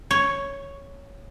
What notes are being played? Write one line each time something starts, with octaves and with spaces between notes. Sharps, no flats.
C#5